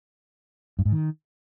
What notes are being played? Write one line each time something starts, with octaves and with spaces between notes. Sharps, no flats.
G2
G#2
D#3